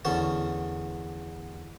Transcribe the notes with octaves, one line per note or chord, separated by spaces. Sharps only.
E2 D3 C#4 A5